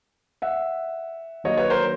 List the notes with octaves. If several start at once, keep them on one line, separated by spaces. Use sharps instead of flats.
E5 F#5
D#3 F#3 A#3 D4 C#5 D#5
B4 C#5
A#4 C5